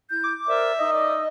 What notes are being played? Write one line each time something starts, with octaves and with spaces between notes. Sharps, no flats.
E4 G6
D6
A#4 C5 D5 E5
D#4 D#5 D#6 E6
D5